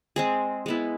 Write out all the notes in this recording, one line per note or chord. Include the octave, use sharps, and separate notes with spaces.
G#3 C4 G#4
G#3 B3 E4